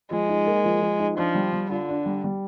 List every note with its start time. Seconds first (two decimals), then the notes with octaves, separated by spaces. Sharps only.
0.11 F3 G#3
0.29 D#4
0.46 A#3
0.64 F3
0.82 F3
1.00 D#4
1.17 F3 D4
1.35 G3
1.53 G3
1.71 D3 F4
1.89 D4
2.06 G3
2.24 G3